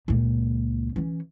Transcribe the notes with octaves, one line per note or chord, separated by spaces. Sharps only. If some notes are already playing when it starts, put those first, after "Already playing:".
C#2 A#2
E3 C#4